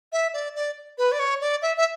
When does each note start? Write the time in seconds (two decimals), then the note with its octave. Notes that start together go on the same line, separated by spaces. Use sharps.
0.12 E5
0.33 D5
0.56 D5
0.98 B4
1.12 D5
1.19 C#5
1.41 D5
1.62 E5
1.77 E5